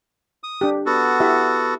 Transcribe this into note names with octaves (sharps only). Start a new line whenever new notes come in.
D#6
D4 G4
B3 F#4 A4
E4 G4 E5